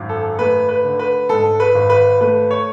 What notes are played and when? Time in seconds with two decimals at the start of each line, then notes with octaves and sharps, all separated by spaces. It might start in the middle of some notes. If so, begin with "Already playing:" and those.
Already playing: G#1 F#2
0.09 A4
0.39 A3 B4
0.69 B4
0.84 D3
0.99 B4
1.29 G#2 A4
1.60 B4
1.74 G#1
1.90 B4
2.21 A3 B4
2.51 C#5